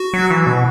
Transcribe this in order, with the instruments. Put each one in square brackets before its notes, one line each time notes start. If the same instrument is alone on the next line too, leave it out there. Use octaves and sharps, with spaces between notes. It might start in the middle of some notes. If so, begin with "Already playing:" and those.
Already playing: [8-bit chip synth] F#4
[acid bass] F#3
E3
B2